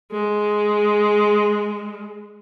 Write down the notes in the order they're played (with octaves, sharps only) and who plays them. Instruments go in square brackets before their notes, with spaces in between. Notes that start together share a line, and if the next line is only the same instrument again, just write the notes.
[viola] G#3